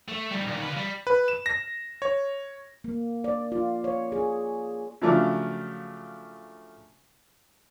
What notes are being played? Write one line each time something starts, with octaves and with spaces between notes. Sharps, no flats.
A3
G3 D#4
A#2 D#3
F4 B4
G3
B4
E7
A#6
C#5
A#3
D5
F4
C#5
G#4
C#3 F3 F#3 A3 D4